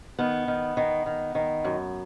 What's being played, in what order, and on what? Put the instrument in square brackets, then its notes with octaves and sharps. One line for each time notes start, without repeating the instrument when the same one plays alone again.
[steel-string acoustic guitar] D#3 B3
D#3
D#3
D#3
D#3
F#2